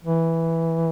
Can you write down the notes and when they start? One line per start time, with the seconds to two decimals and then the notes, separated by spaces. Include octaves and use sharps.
0.05 E3